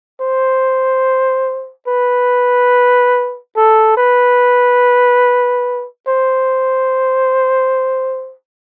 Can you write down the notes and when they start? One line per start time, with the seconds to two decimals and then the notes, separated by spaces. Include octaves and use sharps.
0.20 C5
1.87 B4
3.56 A4
3.97 B4
6.07 C5